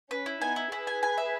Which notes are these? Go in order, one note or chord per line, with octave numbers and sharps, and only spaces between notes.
C#4 B4
E4
B3 D#4 G#5
E4
E4 G#4 B4
G#5
G#5
E5